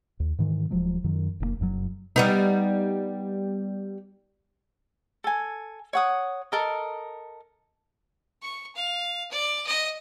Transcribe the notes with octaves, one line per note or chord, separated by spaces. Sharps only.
D#2
G#2 D#3 E3
D#1 F3 F#3 G#3
F#2 D#3 F#3
F1 B2 A#3
F1 F#2 C#3 F#3
G3 B3 D#4
A4 G#5
C#5 F#5 D#6
A4 A#4 D#5
C#6
F5
D5
D#5